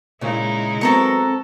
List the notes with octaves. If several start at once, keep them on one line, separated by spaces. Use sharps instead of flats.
A#2 C#3 G#3 D#4 E4
F#3 B3 C4 A4 A#4 C#6